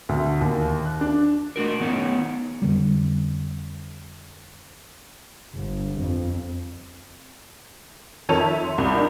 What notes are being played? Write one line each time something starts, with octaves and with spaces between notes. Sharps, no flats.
D2
D#2
F#6
D4
A3 F#4 A#4
D#3 B3 C#4 D#4
F2 D3 G3
G1
F2
F2 D#3 A4 C#5 D#7 F7
E5
C6
C2
D4 D#4 A#4